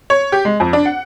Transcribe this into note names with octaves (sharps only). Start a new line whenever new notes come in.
C#5
G4
G#3
F2
D4
F#5